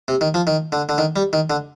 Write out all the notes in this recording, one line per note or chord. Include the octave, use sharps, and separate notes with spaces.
C3
D#3
F3
D#3
D3
D3
D#3
G3
D#3
D3